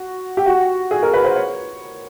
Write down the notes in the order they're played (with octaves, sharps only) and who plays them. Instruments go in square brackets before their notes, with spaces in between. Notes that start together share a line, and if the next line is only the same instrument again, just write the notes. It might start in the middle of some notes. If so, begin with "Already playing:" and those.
Already playing: [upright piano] F#4
G4
F#4
G#4
A#4
B4
C5
C#5